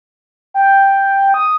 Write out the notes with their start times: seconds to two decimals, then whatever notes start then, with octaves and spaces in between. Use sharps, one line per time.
0.54 G5
1.34 D#6